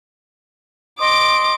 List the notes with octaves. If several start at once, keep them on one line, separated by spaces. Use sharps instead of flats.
D#5 C6 D6 D#6 D7